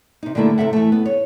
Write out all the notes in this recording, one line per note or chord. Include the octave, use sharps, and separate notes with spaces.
C3 D#4
D3 G3 A3 A#3 E4
C3 F#3 A4 E5 F#5
E3 A3
B3
C#5